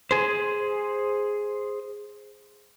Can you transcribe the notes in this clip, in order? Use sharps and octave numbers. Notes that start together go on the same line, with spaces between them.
G#4 C5